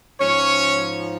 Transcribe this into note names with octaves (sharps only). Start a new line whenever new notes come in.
G#2 F3 C#4 C#5